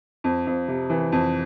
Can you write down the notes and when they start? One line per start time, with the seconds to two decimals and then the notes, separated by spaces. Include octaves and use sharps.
0.24 F2
0.47 F2
0.68 C3
0.90 E3
1.12 F2